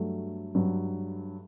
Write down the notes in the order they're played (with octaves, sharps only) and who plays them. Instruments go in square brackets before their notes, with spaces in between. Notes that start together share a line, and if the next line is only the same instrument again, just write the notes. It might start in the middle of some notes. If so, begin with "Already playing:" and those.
Already playing: [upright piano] G2 F#3 A3
G2 F#3